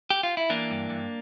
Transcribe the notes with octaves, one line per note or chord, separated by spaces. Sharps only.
G4
F4
E4
E3 A#3 D4
G2
G2